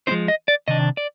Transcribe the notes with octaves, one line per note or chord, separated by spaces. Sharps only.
F3 G#3 C4 D#4 C5
D#5
D5
C3 D#3 D4 D#5
D5